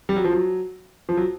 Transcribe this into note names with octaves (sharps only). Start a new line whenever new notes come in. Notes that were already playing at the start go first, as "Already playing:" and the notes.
G3
F#3
F3
F#3
F3
F#3